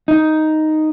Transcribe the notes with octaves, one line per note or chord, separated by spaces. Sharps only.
D#4